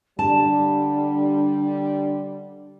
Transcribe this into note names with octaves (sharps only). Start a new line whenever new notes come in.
D3 G3 D4 A5